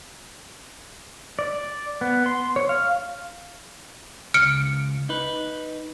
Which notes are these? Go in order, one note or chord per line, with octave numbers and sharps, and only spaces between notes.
D5
B3
C6
C#5
F5
C#2 F6 C#7 D7
D#4 B4